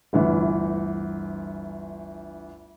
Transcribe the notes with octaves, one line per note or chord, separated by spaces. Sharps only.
G1 D2 E3